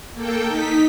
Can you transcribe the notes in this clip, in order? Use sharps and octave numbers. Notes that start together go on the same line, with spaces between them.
A#3 A4 G5
D#4 B6